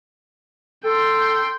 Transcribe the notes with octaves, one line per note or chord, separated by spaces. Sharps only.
A4 G5 C6